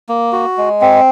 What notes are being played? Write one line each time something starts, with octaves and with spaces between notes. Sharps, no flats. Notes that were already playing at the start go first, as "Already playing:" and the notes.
A#3
F#4
G#3
C4